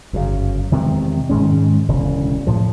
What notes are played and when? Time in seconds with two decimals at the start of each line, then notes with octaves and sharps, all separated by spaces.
0.13 G1 F#2 C#3
0.72 E2 C3 D#3 G#3
1.29 G#2 D#3 G#3 C#4
1.88 E1 D2 C#3
2.47 A2 F3